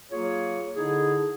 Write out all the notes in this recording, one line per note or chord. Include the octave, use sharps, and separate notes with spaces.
F#3 A#3 F4 G#4 C#5
D3 D#4 E4 G#4